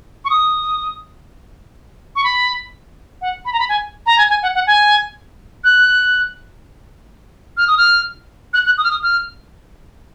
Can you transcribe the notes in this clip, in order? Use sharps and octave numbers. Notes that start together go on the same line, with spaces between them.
C#6
D#6
C#6
B5
F#5
B5
A#5
B5
G#5
A#5
G#5
G#5
F#5
F#5
G#5
F#6
F6
D#6
F6
F#6
F#6
D#6
F6
D#6
F6